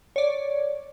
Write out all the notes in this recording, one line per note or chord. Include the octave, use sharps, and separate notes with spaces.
C#5 D5